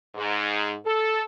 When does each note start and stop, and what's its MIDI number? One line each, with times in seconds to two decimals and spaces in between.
0.16 0.75 44
0.86 1.25 69